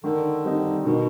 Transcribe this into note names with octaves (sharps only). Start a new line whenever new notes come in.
D3 D#3
G3 C4 D#4
B2 D#3